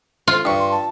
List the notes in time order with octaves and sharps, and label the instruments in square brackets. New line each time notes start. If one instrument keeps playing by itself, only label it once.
[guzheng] F4
[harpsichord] G2 C#6
[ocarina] C6
A5